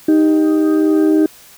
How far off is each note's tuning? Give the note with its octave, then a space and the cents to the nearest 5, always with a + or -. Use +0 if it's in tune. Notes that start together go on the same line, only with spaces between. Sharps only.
D#4 +0 G4 +10